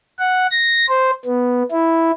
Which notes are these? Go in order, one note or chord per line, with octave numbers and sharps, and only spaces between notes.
F#5
A#6
C5
B3
E4